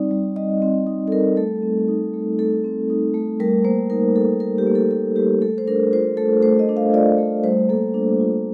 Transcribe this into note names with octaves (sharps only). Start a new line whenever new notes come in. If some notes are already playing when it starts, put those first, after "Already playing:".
Already playing: G3 C4 D#4 D5
G3
G3 D#5
C4
D#4
A4
G3 A#4
A3 A4
C4
D#4
A3
A3 A4
C4
D#4
A3
G3 A#4
A#3 C5
D#4 A#4
G3 A4
G3 A#4
G4
A#3
A4
D#4 A4
G3 G4
A3 A4
C5
D4 A#4
F4 C5
A3 A4
A3 C5
D#5
D4
F5
F4 D5
A3
G3 C5
A#3 A4
D4
F4